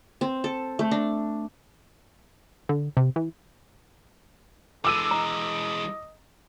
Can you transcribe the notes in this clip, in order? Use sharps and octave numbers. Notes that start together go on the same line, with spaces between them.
C4
A4
A3
D4
D3
C3
E3
E3 G#3 A4 D6 E6 D#7
D#5 A#5